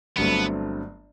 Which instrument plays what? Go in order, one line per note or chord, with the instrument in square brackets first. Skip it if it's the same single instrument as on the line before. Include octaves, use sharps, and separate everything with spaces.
[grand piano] G1 G2 F#3 A3 C4 [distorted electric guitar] B3